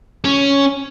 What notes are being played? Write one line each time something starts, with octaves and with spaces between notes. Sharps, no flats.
C#4